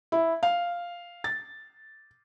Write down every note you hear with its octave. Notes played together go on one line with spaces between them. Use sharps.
E4
F5
A6